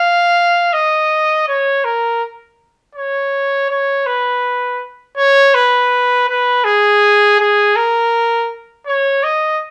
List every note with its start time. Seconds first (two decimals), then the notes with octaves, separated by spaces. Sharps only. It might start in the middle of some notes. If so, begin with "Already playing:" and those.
Already playing: F5
0.73 D#5
1.48 C#5
1.85 A#4
2.95 C#5
3.70 C#5
4.06 B4
5.17 C#5
5.54 B4
6.29 B4
6.64 G#4
7.40 G#4
7.76 A#4
8.87 C#5
9.24 D#5